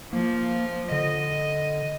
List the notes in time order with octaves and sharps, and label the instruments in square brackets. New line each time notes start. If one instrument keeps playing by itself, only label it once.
[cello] F3 [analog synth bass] A#3
[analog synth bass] D3 [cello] D#5